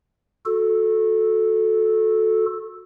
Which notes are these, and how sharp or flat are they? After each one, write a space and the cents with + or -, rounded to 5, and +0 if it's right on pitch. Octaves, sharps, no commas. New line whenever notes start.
F#4 -25 A4 -5